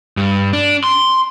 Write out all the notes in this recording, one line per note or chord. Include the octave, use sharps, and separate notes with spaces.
G2
D4
C6